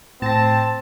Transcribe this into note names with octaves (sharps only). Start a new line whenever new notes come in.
A2 C4 A5 A#6